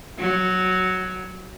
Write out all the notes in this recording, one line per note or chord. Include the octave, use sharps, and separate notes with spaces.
F#3